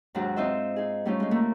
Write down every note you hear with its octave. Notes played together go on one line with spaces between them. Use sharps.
D#2 G#2 F#3 D4 F#4
C4 D#4 F4 C5 D#5 E5
D#4 G#4
G3 A3 C#4 D#4 F4
G#3 D#4
D3 A3 A#3